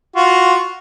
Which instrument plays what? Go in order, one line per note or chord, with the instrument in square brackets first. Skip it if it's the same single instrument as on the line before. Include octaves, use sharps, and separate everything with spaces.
[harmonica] F4 F#4